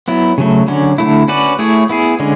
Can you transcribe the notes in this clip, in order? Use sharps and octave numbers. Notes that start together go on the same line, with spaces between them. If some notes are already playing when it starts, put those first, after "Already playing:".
F#3 B3 E4
C#3 F#3 A3
D3 F#3 C#4
D3 A3 E4
C#4 F#4 B4 D5
A3 E4 G#4 C#5
B3 E4 G#4
D3 G#3 C#4